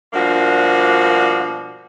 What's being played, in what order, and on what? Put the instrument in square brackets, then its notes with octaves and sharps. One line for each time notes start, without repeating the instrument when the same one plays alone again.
[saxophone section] G2 B2 F3 A#3 D4 F#4